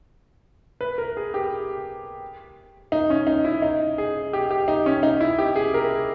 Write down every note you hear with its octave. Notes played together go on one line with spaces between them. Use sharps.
B4
A#4
G#4
G4
D#4
C#4
D#4
E4
D#4
G#4
G4
G4
D#4
C#4
D#4
E4
G4
G#4
A#4